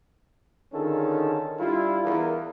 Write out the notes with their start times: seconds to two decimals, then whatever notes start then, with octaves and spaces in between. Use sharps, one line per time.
0.73 D3 D#3 C#4 F4 G#4 A4
1.60 G3 D4 E4 F4
2.05 E2 A#4